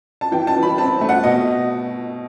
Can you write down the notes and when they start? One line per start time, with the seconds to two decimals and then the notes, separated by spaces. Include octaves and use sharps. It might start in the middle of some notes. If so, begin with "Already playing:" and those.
0.21 A5
0.32 E3 G5
0.47 A5
0.56 E3
0.63 B5
0.78 C4 A5
1.01 A3
1.09 F#5
1.23 B2 D#5